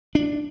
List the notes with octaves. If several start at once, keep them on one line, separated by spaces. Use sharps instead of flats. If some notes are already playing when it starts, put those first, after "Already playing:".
D4